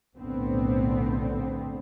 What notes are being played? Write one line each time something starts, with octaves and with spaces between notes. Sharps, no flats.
B1 F2 A2 D3 B3 C4